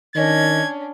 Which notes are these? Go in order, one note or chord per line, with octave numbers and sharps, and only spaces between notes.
D#3 C#4 D4 D#5 G#6